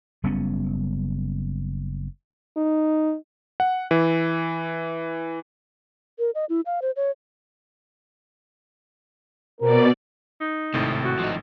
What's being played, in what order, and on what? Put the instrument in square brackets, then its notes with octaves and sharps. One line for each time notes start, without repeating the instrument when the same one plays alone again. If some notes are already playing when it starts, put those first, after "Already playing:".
[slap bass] F#1 G3 B3 C#4
[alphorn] D#4
[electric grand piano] F#5
E3
[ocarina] A#4
D#5
E4
F5
C5
C#5
[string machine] B2 D5 [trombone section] C4 A#4
[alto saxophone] D#4
[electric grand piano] G#1 A2 [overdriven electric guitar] C3
[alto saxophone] F#4
[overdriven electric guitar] F3 D#4